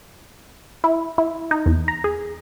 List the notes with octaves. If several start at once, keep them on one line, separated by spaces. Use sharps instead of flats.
E4
E4
D#4
E2
A#5
G#4